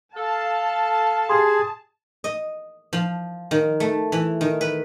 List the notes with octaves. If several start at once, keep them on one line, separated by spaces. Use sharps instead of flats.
A4 F5 A5
G4 G#4 C6
D#5
F3
D#3
A3
E3
D#3
B4